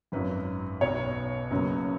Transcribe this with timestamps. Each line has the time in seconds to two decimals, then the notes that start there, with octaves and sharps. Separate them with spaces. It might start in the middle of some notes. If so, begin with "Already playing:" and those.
0.12 G#1 F#2 F#3 B4
0.81 B1 B2 B3 C#5
1.51 F#1 F#2 C#3 F#3 B3